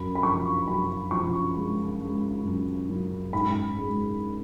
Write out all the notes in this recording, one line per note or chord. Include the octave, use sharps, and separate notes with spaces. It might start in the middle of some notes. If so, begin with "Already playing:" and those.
Already playing: F#2 B5
B5
F3 C#6
F#2 B5
F3 C#6
G#3
G#3
F#2
F#2
G#2 B5
G#3